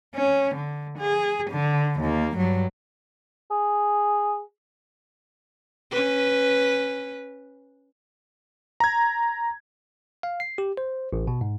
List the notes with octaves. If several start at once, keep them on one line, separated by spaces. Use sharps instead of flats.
C#4
D3
G#4
D3
D#2 A#3
G2 F#3
G#4
C#4 B4
A#5 G#6
F5
C7
G4
C5
A1
B2
G#2